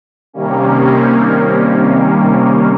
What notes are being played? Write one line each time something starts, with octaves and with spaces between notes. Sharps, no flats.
C3 D#3 G3 A#3 C#4